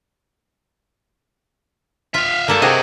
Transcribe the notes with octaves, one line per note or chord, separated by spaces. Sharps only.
F4 E5 F5
G2 A#3 A4 A5
C3 F#4 G#4 D#5 G5